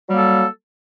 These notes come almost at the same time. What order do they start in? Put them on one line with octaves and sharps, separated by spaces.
F#3 G3 A#3 A4